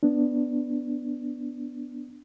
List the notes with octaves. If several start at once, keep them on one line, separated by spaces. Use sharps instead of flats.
B3 D4